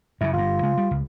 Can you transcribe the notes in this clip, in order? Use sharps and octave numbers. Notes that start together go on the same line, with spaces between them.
F#2 C#3 E4
G1 G2 F4
C#3 G#3
G3
C#2